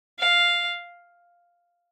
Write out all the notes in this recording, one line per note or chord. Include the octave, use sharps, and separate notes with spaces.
F5